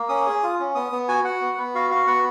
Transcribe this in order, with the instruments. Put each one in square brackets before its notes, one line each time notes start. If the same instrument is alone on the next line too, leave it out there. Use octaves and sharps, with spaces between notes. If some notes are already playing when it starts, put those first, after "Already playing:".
Already playing: [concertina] A#3
C#4 D#6
G#4
F4
C#4
B3 D#6
B3
F#4 G#5
F#4 F#5
B3
B3
F#4 F5
F#4 F5
B3 F#5